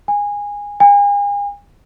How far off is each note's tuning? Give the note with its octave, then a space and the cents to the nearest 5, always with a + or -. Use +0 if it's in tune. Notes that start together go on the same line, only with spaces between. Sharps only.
G#5 -20
G#5 -40